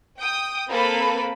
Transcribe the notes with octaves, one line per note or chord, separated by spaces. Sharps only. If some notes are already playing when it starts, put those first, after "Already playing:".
G5 D#6
A#3 C4 A4 B4 B5